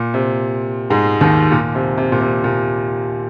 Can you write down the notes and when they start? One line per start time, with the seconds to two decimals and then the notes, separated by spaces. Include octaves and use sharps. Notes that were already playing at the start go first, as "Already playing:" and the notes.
Already playing: A#2
0.14 C3
0.90 G#2 G#3
1.21 D#2 D#3
1.52 A#2
1.75 C3
1.98 C3
2.12 A#2
2.21 C3
2.44 A#2